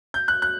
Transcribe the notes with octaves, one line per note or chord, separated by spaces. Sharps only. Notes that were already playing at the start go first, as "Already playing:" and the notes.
G6
F#6
F#6